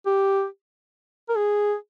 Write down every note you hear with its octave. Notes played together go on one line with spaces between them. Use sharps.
G4
A#4
G#4